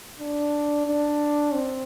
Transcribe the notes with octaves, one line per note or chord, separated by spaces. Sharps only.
D4
D4
C4